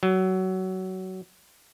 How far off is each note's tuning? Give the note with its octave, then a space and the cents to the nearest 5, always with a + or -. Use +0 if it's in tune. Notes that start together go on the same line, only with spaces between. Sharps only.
F#3 +20